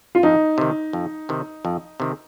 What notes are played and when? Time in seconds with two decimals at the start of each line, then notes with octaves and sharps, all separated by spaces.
0.15 F4
0.23 F2 D#4
0.58 C3 D#3
0.93 F2
1.29 C3 D#3
1.65 F2
2.00 C3 D#3